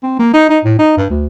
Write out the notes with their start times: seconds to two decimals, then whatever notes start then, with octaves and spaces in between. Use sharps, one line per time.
0.03 C4
0.19 A#3
0.33 D#4
0.49 D#4
0.65 A2
0.79 D#4
0.97 G2
1.10 D2